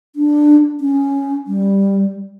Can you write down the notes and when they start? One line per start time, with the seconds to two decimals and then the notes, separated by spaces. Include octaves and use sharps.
0.16 D4
0.81 C#4
1.47 G3